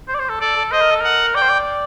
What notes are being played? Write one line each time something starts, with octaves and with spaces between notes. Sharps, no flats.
C5
D5
C5
A4
A4 D5
A4
C5 D#5
A#4
A4
A#4 F#5
D5 G5
C5
D5